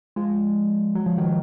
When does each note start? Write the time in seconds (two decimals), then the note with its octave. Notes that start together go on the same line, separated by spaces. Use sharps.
0.16 F3 G#3
0.95 F#3
1.06 F3
1.17 D#3 F#3